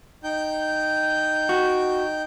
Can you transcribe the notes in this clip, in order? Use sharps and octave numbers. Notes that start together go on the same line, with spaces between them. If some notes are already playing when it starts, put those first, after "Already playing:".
D#4 G5 G6
F#4